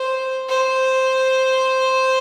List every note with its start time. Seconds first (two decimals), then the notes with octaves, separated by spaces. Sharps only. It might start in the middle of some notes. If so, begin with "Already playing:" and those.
Already playing: C5
0.48 C5